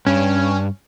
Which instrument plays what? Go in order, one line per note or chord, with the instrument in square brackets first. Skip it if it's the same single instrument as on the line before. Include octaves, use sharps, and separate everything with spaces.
[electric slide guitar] G2 [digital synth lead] C#4